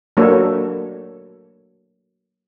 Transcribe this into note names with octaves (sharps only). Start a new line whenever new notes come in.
F#3 A3 A#3 D4 A4 C#5